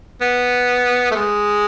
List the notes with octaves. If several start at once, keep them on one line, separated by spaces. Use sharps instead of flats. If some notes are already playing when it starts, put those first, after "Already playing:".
B3
A3
G#3